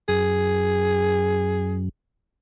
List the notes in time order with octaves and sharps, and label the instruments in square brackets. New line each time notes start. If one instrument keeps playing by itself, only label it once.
[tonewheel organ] F#2 [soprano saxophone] G#4